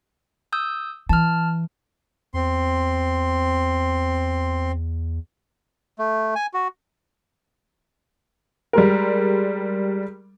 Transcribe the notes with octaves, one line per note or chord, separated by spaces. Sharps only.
D#6 E6 G6
E3 A5 F6
E2 C4 C6
A3
G#5
F#4
G3 G#3 A#4